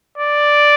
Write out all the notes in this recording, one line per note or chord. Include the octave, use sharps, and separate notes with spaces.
D5